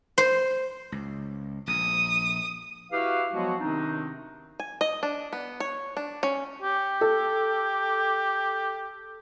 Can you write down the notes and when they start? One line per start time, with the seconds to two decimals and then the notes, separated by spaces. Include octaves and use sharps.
0.18 C5
0.92 C#2
1.67 A#1 D#6
2.92 E4 F#4 G4 B4 F5
3.33 F3 F#3 G#3 B3 F#4
3.59 C3 D#3 C4 D4 D#4
4.60 G#5
4.81 D#5
5.03 D4
5.33 B3
5.60 C#5
5.97 D4
6.23 C#4
6.62 G4
7.01 A4